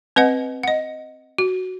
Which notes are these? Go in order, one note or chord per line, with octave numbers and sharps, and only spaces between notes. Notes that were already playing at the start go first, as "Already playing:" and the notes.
C4 B4 D#5 F#5
D#5 F#5
F#4